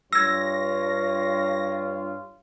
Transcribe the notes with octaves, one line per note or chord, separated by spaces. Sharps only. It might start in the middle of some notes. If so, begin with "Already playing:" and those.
G2 F4 C#5 E6 G#6 A#6